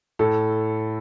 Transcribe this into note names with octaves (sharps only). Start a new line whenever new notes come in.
A2 A4